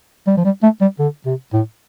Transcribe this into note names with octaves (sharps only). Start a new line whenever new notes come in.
G3
F3
G3
A3
G3
D3
C3
A2